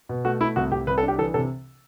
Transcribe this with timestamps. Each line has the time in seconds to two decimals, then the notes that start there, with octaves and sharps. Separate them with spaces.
0.09 B2
0.25 A3 F#4
0.40 A3 E4
0.56 C2 F#4
0.71 C2 G4
0.87 C2 B4
0.98 A4
1.03 D4
1.08 G4
1.18 E3 A4
1.34 C3 A4